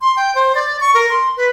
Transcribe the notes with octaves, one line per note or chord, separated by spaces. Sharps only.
C6
G5
C5
D5
C#6
A#4
C6
B4